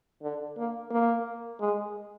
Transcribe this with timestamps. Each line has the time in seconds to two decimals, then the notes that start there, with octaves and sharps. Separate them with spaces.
0.22 D3
0.57 A#3
0.90 A#3
1.60 G#3